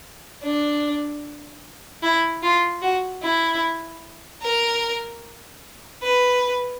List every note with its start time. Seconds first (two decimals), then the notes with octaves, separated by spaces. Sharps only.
0.43 D4
2.03 E4
2.43 F4
2.82 F#4
3.23 E4
4.42 A#4
6.02 B4